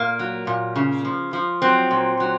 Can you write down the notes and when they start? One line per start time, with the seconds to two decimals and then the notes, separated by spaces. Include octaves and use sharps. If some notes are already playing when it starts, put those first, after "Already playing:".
Already playing: A#2 A#3
0.19 F#3
0.47 A#2
0.76 C#3
1.05 F3
1.33 F3
1.62 F#3 C4
1.91 A#2
2.20 F#3